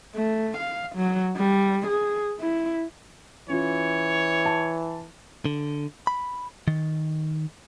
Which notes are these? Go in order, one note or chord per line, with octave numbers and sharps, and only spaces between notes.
A3
F5
F#3
G3
G#4
E4
E3 C#4 F4 C#5
A5
D3
B5
D#3